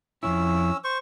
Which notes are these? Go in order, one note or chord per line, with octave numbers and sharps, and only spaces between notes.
F2 G#2 C#4 E4 E6
C5 C#6